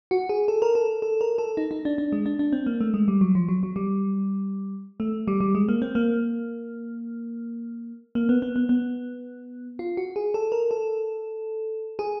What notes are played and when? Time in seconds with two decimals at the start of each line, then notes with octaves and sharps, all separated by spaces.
0.11 F#4
0.29 G#4
0.48 A4
0.62 A#4
0.75 A4
1.02 A4
1.21 A#4
1.38 A4
1.57 D#4
1.71 D#4
1.85 D4
1.98 D4
2.12 G#3
2.26 D4
2.39 D4
2.53 C4
2.66 A#3
2.81 A3
2.94 G#3
3.08 G3
3.21 F#3
3.35 F3
3.49 F#3
3.63 F#3
3.76 G3
5.00 A3
5.28 G3
5.40 G3
5.55 G#3
5.69 A#3
5.82 C4
5.95 A#3
8.15 A#3
8.29 B3
8.42 B3
8.56 B3
8.69 B3
9.79 F4
9.97 F#4
10.16 G#4
10.34 A4
10.52 A#4
10.71 A4
11.99 G#4